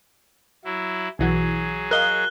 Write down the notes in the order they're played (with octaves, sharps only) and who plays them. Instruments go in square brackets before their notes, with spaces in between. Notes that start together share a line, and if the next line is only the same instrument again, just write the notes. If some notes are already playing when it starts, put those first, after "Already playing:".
[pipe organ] F#3 E4
[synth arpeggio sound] B1 E3 F#4 [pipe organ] F#3 G#4
[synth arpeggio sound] A#4 D#5 F5 [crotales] F#6 G7